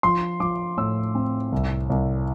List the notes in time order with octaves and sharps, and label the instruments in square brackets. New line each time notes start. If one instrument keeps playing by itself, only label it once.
[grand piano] F3 C6
F3 D6
A2 E6
C4
C2
C2